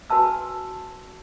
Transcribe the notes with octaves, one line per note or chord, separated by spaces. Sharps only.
F#4 B4 G#5 A5 E6